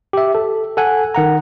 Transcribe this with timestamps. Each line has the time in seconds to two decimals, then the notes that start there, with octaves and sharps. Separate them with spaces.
0.13 G4 E5
0.35 A4
0.77 A4 F#5 G#5 F#6
1.15 D#3 F#5 A#5